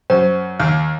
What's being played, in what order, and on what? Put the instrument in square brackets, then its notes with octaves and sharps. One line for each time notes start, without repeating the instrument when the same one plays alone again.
[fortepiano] F#2 [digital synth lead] C5
[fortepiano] D#2 [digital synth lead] F5